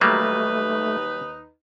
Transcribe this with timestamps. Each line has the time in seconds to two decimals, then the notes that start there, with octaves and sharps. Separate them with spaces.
0.01 D#2 F#3 G3 A3 A#3 D#4 B4